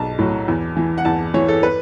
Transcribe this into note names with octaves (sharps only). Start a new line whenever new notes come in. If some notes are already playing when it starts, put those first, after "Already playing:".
Already playing: B1 A5
A2 F#3
E2
E3
F#5
E2 A5
E3 C#5
A4
B4